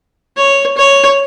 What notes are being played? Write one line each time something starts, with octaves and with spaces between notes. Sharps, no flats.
C#5
C#5